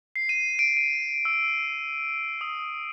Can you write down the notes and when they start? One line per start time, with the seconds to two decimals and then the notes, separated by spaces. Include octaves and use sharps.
0.16 C7
0.29 D#7
0.59 D7
0.77 D#7
1.25 E6
2.41 D#6